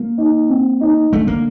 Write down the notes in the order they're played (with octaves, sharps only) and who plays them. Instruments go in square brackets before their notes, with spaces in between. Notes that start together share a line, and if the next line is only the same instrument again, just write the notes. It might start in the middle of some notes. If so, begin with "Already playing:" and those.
Already playing: [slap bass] A#3
[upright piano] D#4
C4
D#4
[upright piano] D3 [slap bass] A3
[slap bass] A#3